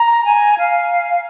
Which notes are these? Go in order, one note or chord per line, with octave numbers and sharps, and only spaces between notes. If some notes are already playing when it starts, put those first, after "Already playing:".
Already playing: A#5
G#5
F5